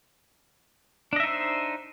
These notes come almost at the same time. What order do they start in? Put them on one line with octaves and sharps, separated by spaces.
D4 D#5 E5 D#4 C5